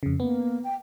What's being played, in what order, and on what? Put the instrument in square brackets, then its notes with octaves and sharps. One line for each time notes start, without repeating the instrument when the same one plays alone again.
[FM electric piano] F2 C#3
[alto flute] A#3 [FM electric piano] B3
[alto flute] G5